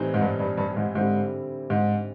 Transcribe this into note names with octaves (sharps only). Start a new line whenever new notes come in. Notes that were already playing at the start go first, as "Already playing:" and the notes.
Already playing: A2 E3 G3 C4 D#4
G#2
G2
G2
G2
G#2
G#2 D3 G3 C4 E4 G4
G#2